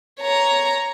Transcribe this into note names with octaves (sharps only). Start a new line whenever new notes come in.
C#5 A#5